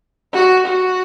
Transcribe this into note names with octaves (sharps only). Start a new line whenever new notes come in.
F#4
F#4